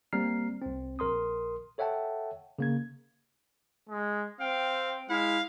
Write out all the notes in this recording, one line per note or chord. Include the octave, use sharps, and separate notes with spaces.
G3 A#3 C4 A#5 F6 C7
C2 C4
A#1 A#4 C6 D#6
A4 C#5 E5 F#5 G5 A5
C#3 A#3 G#6
G#3
C4 F5 G5
G#3 E4 F5